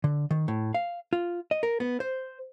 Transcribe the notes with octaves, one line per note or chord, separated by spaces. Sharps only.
D3
D#3
A2
F5
F4
D#5
A#4
B3
C5